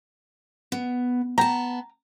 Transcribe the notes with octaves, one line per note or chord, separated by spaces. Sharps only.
B3
B3 G5 A5 A#5